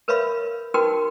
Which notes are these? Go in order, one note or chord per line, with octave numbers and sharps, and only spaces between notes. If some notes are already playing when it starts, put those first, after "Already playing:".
A#4 B4 C#5 E5 F5 B5
D#4 F#4 A#4 B4 G5 C6